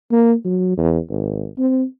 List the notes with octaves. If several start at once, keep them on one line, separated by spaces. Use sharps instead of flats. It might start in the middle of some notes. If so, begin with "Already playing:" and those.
A#3
F#3
E2
G#1
C4